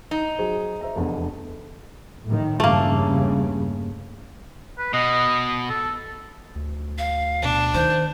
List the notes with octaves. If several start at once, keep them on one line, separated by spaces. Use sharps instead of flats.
D#4
F#3 G#4 C5
C5 E5 A#5
F1 E2 D4
A2 D#3
E2 G2 C#3 A3 A#3
B4
B2 D#5
A4
D2
F5
B2 D4
D#3 C5